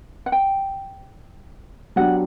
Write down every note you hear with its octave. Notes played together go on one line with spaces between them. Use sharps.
F#5
G5
F#3 B3 D4 G4 F#5